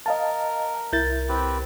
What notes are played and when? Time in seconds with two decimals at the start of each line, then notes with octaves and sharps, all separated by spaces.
0.06 A#4 D#5 F5 A5
0.93 C2 E4 A#4 G6 A6
1.29 C4 G4 B4